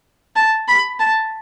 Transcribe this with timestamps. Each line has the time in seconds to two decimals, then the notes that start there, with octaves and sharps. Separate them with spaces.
0.36 A5
0.68 B5
1.00 A5